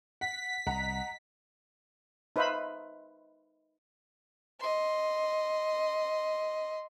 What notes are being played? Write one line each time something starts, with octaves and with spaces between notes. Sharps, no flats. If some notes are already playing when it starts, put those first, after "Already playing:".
F#5 B6
C2 D#5 F#5 A#5
D#4 B4 C5 E5 F5 B5
D#5 C6